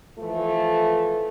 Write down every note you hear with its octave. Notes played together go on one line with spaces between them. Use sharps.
E3 F3 A3